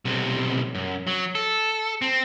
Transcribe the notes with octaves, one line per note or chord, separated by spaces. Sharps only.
B1 C3
F#2
F#3
A4
C4